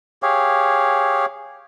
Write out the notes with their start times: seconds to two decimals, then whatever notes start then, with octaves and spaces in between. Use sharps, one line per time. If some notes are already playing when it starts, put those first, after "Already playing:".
0.23 G4 G#4 C#5 F5